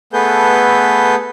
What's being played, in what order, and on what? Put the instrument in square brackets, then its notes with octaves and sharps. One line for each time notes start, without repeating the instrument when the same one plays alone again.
[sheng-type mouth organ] A3 B3 G#4 A4 B4 G6